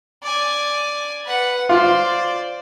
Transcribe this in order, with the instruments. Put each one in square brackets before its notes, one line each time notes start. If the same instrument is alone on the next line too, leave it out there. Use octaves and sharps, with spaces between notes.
[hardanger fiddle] D5 G#5
B4 F#5
[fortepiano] F4 [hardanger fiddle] C5 D5